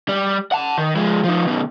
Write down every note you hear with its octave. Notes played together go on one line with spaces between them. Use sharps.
G3
F#5 A5
D#3
F3 G#3
F3 D#4
B2 D#3